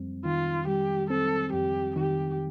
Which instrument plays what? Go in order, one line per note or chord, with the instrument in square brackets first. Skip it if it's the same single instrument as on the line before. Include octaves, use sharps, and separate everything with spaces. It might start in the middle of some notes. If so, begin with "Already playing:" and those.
Already playing: [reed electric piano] F2 G3 C4
[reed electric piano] D#3 [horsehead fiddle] F4
[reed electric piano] G3 [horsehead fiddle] G4
[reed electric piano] C4 [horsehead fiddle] A4
[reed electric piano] F2 [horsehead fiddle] G4
[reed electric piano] D#3 [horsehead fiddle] G4